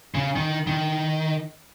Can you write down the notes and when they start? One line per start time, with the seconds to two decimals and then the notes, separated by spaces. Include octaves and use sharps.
0.15 C#3
0.36 D#3
0.67 D#3